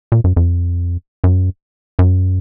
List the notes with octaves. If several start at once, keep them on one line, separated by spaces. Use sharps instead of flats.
A#2
F#2
F2
F#2
F#2